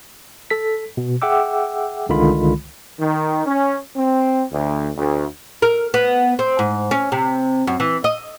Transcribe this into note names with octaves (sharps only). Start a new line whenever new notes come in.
A4 B6
B2
G#4 E5 F#5 G5 D6 E6
C2 D3 D#3 G#3 F4 B5
D#3
C#4
C4
D2
D2
A#4
B3
C4
G#2
C#4
C3
F#2
E3
D#5